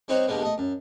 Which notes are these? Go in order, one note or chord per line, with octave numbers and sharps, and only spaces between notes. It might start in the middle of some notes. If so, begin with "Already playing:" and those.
G3 C4 D#4 F#4 C5 C#5
G2 B2 G3 G#3 A#3 B3
A3 D#5
F#2